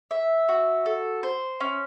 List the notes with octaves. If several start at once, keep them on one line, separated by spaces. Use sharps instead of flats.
E5
F#4
A4
C5
C#4